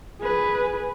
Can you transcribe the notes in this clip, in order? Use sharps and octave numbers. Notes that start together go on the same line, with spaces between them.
G#4 B4